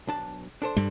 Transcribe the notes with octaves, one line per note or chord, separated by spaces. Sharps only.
B1 D4 A5
D4 A4 C5
G2 G3